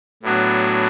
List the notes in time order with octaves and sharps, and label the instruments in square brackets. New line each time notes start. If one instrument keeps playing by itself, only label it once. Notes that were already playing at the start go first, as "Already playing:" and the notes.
[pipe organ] A2 F#3 B3 D4 F#4